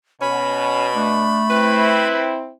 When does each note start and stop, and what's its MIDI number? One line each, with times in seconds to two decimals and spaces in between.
0.21 1.34 47
0.21 0.90 61
0.21 2.07 83
0.96 2.20 57
0.96 1.44 62
1.50 2.52 60
1.50 2.52 64
1.50 2.33 71